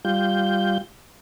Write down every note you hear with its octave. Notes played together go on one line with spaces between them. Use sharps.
G3 F4 G6